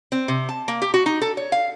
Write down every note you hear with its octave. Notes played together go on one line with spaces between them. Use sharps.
C4
C3
A5
A#3
G4
F#4
D#4
A4
C#5
F5